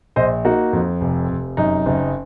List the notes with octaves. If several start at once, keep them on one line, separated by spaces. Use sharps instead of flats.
A#1 C5 D#5
A#3 D#4 F#4
F2
F1
F1
F#2 D#4
F#1